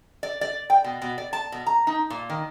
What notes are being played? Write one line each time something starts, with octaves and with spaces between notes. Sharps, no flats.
D5
D5
G5
B2
B2
D5
A5
B2
A#5
D#4
A#2
D#3